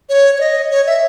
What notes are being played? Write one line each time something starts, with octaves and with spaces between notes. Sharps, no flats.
C#5
C#5
D#5
C#5
E5